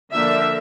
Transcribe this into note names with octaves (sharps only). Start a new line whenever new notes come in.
D3 F3 A#3 D4 E5